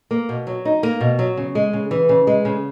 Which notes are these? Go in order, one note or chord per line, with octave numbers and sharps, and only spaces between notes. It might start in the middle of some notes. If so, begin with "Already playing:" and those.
A#3
B2
F#3
D#4
A#3
B2
F#3
C#3
G#3
C#3
E3
C#3
G#3
C#3